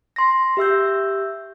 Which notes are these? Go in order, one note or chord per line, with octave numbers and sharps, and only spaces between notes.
C6 A#6
G4 E5 E6 G6